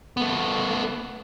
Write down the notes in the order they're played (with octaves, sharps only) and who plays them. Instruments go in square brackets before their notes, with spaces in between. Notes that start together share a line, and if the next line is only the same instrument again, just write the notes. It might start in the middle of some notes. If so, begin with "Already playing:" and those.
[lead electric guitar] A3 B3